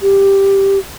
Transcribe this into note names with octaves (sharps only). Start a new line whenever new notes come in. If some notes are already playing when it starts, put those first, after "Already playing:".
G4